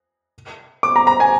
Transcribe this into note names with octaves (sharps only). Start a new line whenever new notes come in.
D6
A#5
A#5
G#5